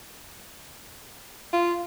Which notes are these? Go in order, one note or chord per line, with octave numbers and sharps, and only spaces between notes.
F4